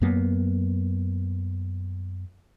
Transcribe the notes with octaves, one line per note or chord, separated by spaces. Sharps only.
F#2 F#3 A#3 B3